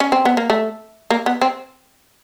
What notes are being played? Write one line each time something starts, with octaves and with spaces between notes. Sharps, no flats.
C#4
C4
B3
A#3
A3
A#3
B3
C4